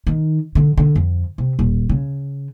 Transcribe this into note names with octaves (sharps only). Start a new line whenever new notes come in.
D#3
D3
D3
F2
C3
D#1
C#3